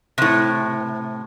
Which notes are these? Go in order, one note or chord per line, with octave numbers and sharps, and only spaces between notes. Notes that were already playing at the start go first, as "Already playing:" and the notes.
A2 C3